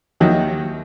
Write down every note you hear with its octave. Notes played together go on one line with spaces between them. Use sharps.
D#2 D#3 F#3 E4 D#5